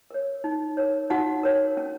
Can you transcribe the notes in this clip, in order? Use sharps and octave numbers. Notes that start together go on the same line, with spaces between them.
A#4 C#5
D#4
A#4 C#5
D#4 F#4 F#5
A#4 C#5
C#4